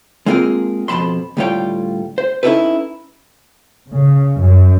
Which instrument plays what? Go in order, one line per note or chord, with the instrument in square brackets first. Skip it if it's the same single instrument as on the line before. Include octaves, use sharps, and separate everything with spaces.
[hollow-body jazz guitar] G#3 A#3 C4 F4 G#4 A#4
F2 B2 G#3 A5 B5 C6
D2 A2 G3 F4 C#5 G5
C5
C#4 D#4 E4 G4 A4 B4
[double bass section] C#3
F#2